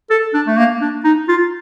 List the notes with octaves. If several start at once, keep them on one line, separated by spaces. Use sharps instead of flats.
A4
D4
A3
A#3
D4
D#4
F4